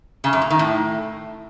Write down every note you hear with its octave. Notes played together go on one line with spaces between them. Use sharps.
C#3
F#2
A#2
D#3
A2